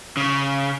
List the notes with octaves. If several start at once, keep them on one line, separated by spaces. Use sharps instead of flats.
C#3